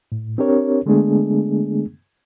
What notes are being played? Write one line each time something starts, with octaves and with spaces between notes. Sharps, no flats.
A2
C4 D4 G4 A#4 C#5
D3 G#3 A3 B3 D4 G#4